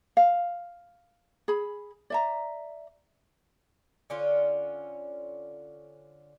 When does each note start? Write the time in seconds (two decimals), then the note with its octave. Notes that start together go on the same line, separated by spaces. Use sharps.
0.17 F5
1.48 G#4 B5
2.10 D5 E5 A#5
4.10 D3 C#4 F4